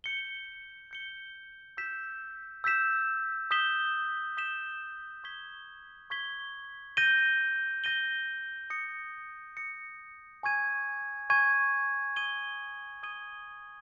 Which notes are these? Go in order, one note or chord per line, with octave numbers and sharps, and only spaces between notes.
G6 C#7 G7
G6 C#7 G7
E6 G6 B6 E7
E6 G6 B6 E7
D#6 G6 B6 E7 G7
D#6 G6 B6 E7 G7
C#6 G#6 B6 G7
C#6 G#6 B6 G7
G6 A#6 D#7 G7
G6 A#6 D#7 G7
D#6 A#6 C#7
D#6 A#6 C#7
G#5 C#6 G#6 D#7
G#5 C#6 G#6 D#7
D#6 G#6 D#7 G7
D#6 G#6 D#7 G7